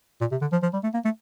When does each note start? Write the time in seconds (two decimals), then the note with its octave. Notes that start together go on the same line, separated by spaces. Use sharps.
0.21 A#2
0.31 C3
0.41 D3
0.52 F3
0.63 F3
0.73 G3
0.83 A3
0.94 A#3
1.05 A3